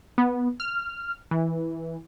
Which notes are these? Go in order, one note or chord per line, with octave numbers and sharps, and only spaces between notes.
B3
F6
E3